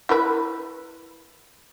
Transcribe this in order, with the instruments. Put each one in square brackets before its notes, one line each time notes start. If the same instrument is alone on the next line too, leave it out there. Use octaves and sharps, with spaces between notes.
[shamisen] E4 A#4 B4